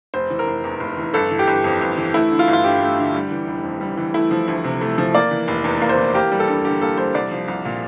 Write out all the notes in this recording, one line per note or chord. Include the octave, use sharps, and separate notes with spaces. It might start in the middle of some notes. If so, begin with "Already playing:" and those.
F1 C5
E3
A#4
F1
E2
F1
E3
G1 A4
E3
G4
G1
F2
G1
E3
A3 E4
D3
F4
G1
F4
G2 G4
A3
D3
G3
E3
F1
F2
G3
E3
A3 E4
F3
D2
C3
A3
F3
A#3 D5
E3
F1
E2
A#3
C5
E3
A#3 G4
G3
A4
G2
D3 G4
A#3 A4
G3 C5
C2 D5
F3
C2
A#2